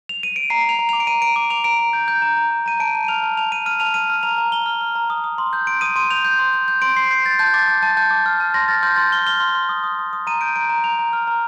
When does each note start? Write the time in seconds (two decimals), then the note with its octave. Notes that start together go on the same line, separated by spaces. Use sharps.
0.09 F7
0.23 D#7
0.36 D7
0.50 A#5 C7
0.65 A#5 F7
0.79 A#5
0.89 D6 F7
1.00 D7
1.07 A#5 D#7
1.22 A#5 D7
1.36 D6
1.50 D6 F7
1.64 A#5 D7
1.79 A#5
1.93 G6
2.08 G6
2.22 A#5
2.37 A#5
2.51 A#5
2.66 A#5 D#7
2.80 A5 D7
2.95 A5
3.04 D#7
3.08 F6 F7
3.23 A5
3.37 A5 F7
3.52 A5 D#7
3.66 F6 D#7
3.80 A5 F7
3.94 F6 D#7
4.10 F6
4.23 A#5 F7
4.38 A#5
4.52 A#5 G7
4.66 F6
4.81 F6
4.95 A#5
5.10 D#6
5.24 D#6
5.38 C6
5.53 G6
5.67 C6 D7
5.81 D#6 D#7
5.96 C6 D#7
6.10 G6 F7
6.25 G6
6.39 C6
6.53 G6
6.68 G6
6.82 C6 D7
6.96 C6 C7
7.11 G6 C7
7.25 G6 A6
7.39 A5 G6
7.54 D6 A6
7.68 D6 G6
7.82 A5 A6
7.97 A5 G6
8.11 D6
8.26 F6
8.40 A5
8.54 C6 A#6
8.68 F6 A6
8.83 C6 G6
8.96 C6 A6
9.12 F6 G7
9.26 F6 G7
9.40 C6
9.55 C6
9.69 D#6
9.84 D#6
9.99 D#6
10.13 D#6
10.27 A#5 D#7
10.41 G6 D7
10.56 A#5 D7
10.69 A#5
10.84 A#5 F7
10.99 A#5
11.13 F6
11.27 A#5